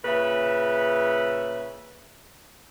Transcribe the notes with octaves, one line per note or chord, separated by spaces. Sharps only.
A#2 C#3 B4 E5